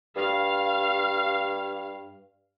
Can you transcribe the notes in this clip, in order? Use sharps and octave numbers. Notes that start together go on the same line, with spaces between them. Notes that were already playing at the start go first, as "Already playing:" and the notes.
G2 F5